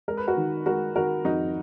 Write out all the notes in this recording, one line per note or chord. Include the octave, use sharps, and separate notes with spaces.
G#3 A#4
B4
F#4 A#4
D#3
G#3 F#4 A#4
D#3 F#4 A#4
F2 D#4 F#4